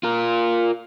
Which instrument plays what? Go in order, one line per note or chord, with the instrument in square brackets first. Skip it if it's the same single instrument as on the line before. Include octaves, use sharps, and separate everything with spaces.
[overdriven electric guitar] F4 A#4